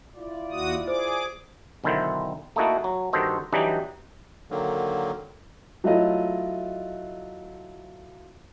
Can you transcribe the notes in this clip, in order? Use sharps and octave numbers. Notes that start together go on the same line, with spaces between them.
E4 F4 D5
D#2 F#4 D#6
G#4 C5 D6
B1 D3 D#3 E4 C5
A3 A#3 D#4 E4 F#4 A4
F#3
G2 D#3 F#4 A4 C5 D#5
E3 F#3 G3 D4 D#4 G4
D3 D#3 F#3 A#3
F#3 A3 E4 F4 D#5